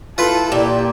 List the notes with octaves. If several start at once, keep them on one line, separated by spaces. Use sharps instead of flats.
E4 F4 A4 B4
A#2 G4